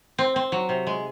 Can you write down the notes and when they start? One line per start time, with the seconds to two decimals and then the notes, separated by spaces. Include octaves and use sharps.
0.18 C4
0.36 C4
0.52 F#3
0.69 C3
0.87 G#3